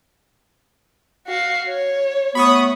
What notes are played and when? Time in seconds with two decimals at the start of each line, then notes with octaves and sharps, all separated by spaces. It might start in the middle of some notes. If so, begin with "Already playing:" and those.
1.27 F#4 F5
1.68 C#5
2.35 F#3 A3 B3 B5 C#6 D#6